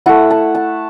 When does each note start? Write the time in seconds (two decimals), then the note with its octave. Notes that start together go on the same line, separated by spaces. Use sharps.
0.06 A3 E4 F#5
0.31 A5
0.55 A5